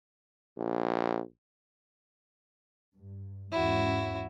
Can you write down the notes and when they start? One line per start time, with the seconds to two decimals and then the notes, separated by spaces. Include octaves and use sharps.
0.57 A#1
2.96 G2
3.52 E2 G#2 C#4 E4 F#4